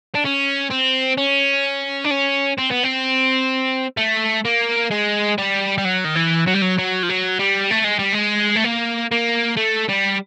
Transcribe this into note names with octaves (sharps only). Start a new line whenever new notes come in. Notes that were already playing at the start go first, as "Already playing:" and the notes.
D4
C#4
C4
C#4
D4
C#4
C4
B3
C4
A3
A#3
G#3
G3
G3
F#3
D#3
E3
F#3
G3
F#3
F#3
F3
F#3
G3
A3
G#3
G3
G#3
A3
A#3
A#3
A3
G3